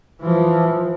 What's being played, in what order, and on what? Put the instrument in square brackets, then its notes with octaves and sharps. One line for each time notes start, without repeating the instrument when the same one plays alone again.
[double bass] E3 F3